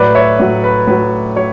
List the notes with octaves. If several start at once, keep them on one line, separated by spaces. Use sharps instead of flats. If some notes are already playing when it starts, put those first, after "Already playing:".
Already playing: A2 F#3 B4 D5
C#5 E5
A2 F#3 C#5
B4
A2 F#3 B4
F#3 C#5